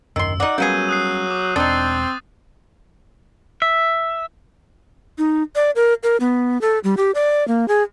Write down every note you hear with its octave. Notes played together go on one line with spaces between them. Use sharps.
D#1 G#1 F#2 D#3 C6 E6
D#4 F#4 D5
F#3 G3 A#3 B3 C#4 G#4 G6 D#7
D#6 F#6 C7
D6
E1 C4 D4 D#4 A6
E5
D#4
D5
A#4
A#4
B3
A4
G3
G4
D5
A#3
G#4